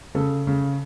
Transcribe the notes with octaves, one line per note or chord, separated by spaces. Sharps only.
C#3 A4
C#3